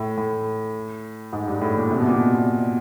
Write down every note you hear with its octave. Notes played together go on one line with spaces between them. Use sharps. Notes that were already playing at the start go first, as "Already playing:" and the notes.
Already playing: A2
A2
G#2
G2
A2
A#2
C3
B2
A#2
B2